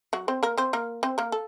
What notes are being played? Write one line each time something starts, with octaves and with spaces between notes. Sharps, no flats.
F#3 F#4
C4 C5
A#3 A#4
C4 C5
A#3 A#4
C4 C5
A#3 A#4
A4